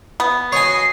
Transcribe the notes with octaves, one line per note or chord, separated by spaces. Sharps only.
B3
F#4 C#5 D#5 G#5 D#6 C7